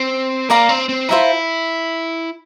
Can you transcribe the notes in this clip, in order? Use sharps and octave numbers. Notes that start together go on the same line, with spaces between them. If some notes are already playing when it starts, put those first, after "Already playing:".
Already playing: C4
A#3 A#4 D5 F5 A#5
C4
C4
E4 F4 C5 E5 A#5